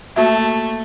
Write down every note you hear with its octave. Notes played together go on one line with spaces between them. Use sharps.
A3 A#3 F#4 E5